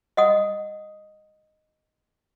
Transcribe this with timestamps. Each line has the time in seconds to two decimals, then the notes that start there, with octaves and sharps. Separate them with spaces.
0.17 D#5 F#5 D#6